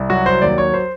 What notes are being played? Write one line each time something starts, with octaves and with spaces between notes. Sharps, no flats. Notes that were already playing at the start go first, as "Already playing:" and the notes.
Already playing: C2
F#3 F#4
C5
D#2 D5
C#5
C5